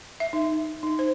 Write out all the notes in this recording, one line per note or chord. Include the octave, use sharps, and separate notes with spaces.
E5
D#4
D#4
C5